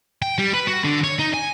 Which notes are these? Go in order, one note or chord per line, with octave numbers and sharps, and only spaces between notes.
G5
G3
B4
F#4
D3
C#5
D#4
G#5